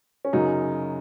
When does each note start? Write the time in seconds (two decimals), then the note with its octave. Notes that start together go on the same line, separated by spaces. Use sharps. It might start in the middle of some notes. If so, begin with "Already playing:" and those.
0.25 C#4
0.33 F#2 C#3 F#3 D#4